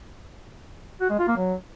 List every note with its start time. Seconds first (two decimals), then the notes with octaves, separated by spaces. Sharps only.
1.01 F#4
1.10 G#3
1.19 F4
1.28 A#3
1.37 F#3